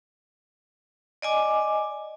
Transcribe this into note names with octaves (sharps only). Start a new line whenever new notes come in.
D5 D#5 G#5 D6